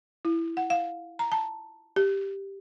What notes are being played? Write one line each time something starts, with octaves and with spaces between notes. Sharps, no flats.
E4
F#5
F5
A#5
A5
G4